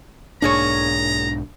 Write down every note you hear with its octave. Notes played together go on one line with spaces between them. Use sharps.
B1 G#2 A#3 D4 G#4 C#5 A#5